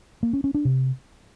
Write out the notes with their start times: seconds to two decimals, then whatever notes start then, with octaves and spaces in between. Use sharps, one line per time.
0.23 A#3
0.33 C#4
0.44 C#4
0.54 D4
0.65 C3